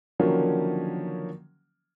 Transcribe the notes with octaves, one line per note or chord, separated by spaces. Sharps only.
D3 D#3 F3 F#3 A#3 C#4